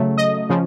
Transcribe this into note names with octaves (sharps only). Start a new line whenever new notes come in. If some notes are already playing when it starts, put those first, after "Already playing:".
Already playing: C#3 F#3 A3
D#5
C#3 F3